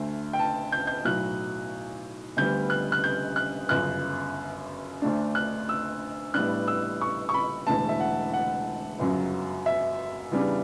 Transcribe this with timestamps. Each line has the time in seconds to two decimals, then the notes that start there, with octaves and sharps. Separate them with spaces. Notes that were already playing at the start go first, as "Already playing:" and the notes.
Already playing: D2 D3 A3
0.33 G5
0.39 A5
0.72 G6
0.87 G6
1.05 B1 A2 F#3 F#6
2.37 D2 D3 G3 B3 G6
2.70 F#6
2.92 F#6
3.04 G6
3.36 F#6
3.69 G1 F#2 C#3 F#6
5.02 D2 D3 A3 D4
5.35 F#6
5.69 E6
6.34 A1 A2 G3 B3 D4 F#6
6.68 E6
7.01 C#6
7.29 C#6
7.34 B5
7.67 E1 E2 D3 A3 A5
7.89 E5
8.00 F#5
8.33 F#5
8.99 G1 F#2 C#3 F#3
9.66 E5
10.31 E2 C#3 G3 B3 D4